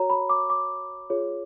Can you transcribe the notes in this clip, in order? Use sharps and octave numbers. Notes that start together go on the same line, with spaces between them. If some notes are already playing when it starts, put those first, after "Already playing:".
Already playing: F#4 A#4 C#5 A#5
B5
D6
D6
F4 G#4 C#5